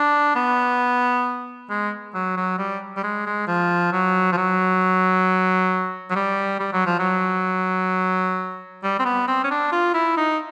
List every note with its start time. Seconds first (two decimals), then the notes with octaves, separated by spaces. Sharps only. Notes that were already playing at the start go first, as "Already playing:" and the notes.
Already playing: D4
0.35 B3
1.70 G#3
2.14 F#3
2.37 F#3
2.58 G3
2.96 G3
3.03 G#3
3.26 G#3
3.48 F3
3.92 F#3
4.32 F3
4.37 F#3
6.10 F#3
6.16 G3
6.60 G3
6.73 F#3
6.86 F3
6.99 F#3
8.83 G3
8.99 C4
9.05 B3
9.28 C4
9.44 C#4
9.51 D4
9.72 F4
9.94 E4
10.17 D#4